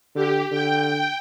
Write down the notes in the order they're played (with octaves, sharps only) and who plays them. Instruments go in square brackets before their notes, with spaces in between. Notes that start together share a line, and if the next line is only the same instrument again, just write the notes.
[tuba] D3 [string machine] G4
[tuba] D3 [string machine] G5